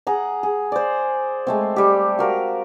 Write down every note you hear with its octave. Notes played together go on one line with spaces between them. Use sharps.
G#4 F#5 A#5
G#4
C5 D5
G#3 A3 C4
G3 G4
F#4 A#4 F5